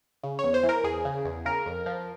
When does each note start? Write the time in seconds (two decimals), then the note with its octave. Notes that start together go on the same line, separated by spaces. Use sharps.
0.24 C#3
0.39 E2 C#5
0.54 C5
0.63 E3
0.69 A#4
0.84 E2 G#4
1.05 C#3
1.25 E2
1.45 C#3 A#4
1.66 F2
1.86 F3